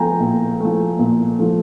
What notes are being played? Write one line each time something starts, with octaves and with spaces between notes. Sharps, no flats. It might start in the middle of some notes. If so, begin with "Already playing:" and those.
Already playing: F3 A3 G5 G#5 A#5
A#2
F3 A3
A#2
F3 A3